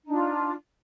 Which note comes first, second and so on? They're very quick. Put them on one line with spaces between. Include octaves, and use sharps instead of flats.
D#4 D4 F4